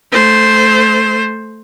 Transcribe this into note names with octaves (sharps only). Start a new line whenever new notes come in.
A3 C5